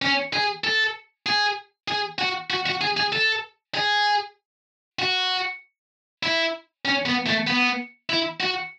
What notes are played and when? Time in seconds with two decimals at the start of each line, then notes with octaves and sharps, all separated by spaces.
0.02 C#4
0.33 G#4
0.64 A4
1.26 G#4
1.88 G#4
2.19 F#4
2.50 F#4
2.66 F#4
2.81 G#4
2.97 G#4
3.13 A4
3.75 G#4
4.99 F#4
6.23 E4
6.85 C#4
7.06 B3
7.27 A3
7.47 B3
8.10 E4
8.40 F#4